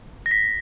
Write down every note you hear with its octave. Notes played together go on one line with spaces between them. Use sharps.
A#6
B6